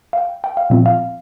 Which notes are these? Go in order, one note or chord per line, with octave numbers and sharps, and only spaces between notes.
F5
G5
G5
F5
A#2 F3 C4 F4 E5
F5